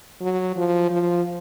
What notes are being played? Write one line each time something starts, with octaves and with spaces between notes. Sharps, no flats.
F#3
F3
F3